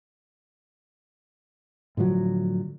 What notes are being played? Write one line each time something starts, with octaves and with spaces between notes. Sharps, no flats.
A2 D3 F3 F#3